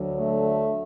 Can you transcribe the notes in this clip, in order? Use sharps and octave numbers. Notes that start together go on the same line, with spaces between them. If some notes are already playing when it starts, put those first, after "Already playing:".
Already playing: D2 D3 F#3
A3